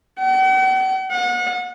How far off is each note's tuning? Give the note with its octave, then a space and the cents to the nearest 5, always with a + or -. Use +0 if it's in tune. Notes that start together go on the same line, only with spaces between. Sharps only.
F#5 +45
F#5 -35